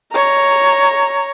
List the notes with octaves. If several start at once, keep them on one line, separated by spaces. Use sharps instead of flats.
C#5 A#5